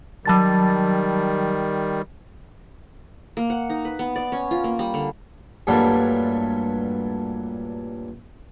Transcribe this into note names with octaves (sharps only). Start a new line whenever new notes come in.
D#3 F#3 G3 A5 A6
A#3
F#5
D#4
B4
B3
D5
C#4
F4
A#3
G3
D3
G2 A#2 F#3 G3 A3